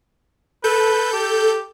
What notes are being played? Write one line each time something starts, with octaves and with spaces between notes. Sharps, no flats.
A4 B4 G6
G4